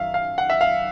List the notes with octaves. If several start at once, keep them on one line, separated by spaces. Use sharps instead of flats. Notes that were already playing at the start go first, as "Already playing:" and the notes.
Already playing: F#2 D#3 F#3 E5 F5
F5
F#5
E5
F5